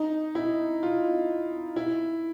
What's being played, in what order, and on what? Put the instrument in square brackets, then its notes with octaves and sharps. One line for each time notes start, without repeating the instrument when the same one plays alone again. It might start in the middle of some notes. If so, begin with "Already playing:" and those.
Already playing: [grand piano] D#4
E4
F4
E4